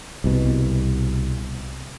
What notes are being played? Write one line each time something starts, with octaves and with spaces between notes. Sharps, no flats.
C2 B2